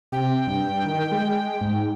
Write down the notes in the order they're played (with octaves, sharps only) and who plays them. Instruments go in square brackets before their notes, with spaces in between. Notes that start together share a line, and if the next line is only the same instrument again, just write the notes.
[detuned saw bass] C3 [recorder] G5
[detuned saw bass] G2
D#3
G#3
G#2